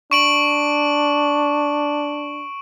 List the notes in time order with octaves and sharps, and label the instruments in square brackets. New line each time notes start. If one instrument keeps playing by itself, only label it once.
[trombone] D4 [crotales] C#6 D7 F#7